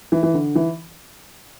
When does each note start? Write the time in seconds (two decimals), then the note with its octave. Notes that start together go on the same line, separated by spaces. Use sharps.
0.12 E3
0.23 E3
0.34 D3
0.55 E3